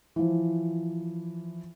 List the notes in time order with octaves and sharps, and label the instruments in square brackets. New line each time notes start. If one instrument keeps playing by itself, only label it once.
[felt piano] E3 F3